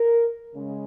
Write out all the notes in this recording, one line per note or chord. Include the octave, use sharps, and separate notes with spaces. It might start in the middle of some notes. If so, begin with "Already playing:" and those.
Already playing: A#4
C#3 G#3 C#4